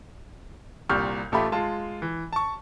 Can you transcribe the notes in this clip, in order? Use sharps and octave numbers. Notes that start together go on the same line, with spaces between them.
C2 A#2 G4 C#6 F6 G6
A1 A3 F4 G4 E5 B5
G#3 F4 A5
E3
A5 C#6